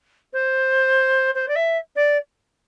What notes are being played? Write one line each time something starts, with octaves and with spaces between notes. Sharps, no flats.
C5
C5
D5
E5
D5